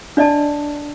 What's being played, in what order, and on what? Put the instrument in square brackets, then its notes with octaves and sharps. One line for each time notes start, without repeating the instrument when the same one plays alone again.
[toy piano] D4 D5 D#5 A5